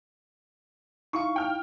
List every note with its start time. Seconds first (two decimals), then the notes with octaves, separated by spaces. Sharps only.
1.13 D#4 E4 F5 C#6
1.36 G5 F6